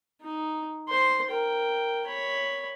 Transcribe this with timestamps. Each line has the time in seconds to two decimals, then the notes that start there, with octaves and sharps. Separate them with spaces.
0.22 D#4
0.89 C5 C6
1.30 A#4 G5
2.06 C#5 B5